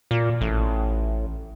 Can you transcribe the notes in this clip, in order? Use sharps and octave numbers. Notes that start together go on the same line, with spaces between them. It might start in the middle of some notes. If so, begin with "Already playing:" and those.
A#2
A1